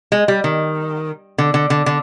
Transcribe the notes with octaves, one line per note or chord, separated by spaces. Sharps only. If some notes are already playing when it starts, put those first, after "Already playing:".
G#3
G3
D#3
D3
D3
D3
D3